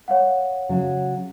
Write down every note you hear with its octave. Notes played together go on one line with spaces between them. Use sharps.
C#5 F5 F#5
C#3 F#3